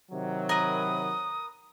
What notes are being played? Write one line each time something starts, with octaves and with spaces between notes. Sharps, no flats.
C3 D#3 F#3
A#4 B4 D#6